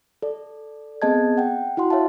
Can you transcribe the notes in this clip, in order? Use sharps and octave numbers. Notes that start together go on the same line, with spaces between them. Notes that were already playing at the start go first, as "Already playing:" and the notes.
A4 D5
B3 C4 G#4 D#5 A5 G#6
F#5 G5
E4 F#4 F#5 C6
C#5 E5 F5 A5